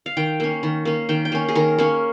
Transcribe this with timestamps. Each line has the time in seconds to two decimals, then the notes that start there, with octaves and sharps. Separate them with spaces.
0.06 F5
0.17 D#3 G5
0.40 A#3 C#4
0.63 D#3
0.85 A#3 C#4
1.09 D#3 G5
1.25 G5
1.32 A#3 C#4
1.49 G#4
1.55 D#3 A#4
1.79 A#3 C#4